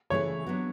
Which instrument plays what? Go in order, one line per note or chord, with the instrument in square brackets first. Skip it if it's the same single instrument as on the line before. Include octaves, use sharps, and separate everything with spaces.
[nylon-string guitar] C#3 E3 A3 E4 G#4 [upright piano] C#5
[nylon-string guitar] F#3 B3 D4 F#4